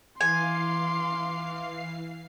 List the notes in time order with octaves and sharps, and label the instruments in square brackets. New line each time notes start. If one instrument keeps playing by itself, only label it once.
[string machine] E3 F5 C7 [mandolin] G#5 [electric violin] C6 D6